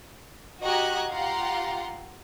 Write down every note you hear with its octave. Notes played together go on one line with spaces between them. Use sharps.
F#4 G4 D#5 A#5 F#6 G#6
F4 G4 F5 F#5 A#5 C6